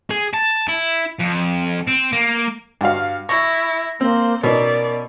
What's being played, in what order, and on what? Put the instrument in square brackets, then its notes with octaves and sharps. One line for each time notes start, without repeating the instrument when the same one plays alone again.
[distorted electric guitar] G#4
A5
E4
F2
C4
A#3
[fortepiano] G2 F#4 F5
[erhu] E4 [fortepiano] C#6 [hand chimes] A#6
[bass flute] A#3 [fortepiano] C4 [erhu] C5
[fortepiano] B2 C#4 D#4 [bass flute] B3 [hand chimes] A#4 [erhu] D5